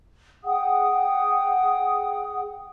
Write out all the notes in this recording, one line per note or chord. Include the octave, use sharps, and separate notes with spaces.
G#4 F#5 G5 D#6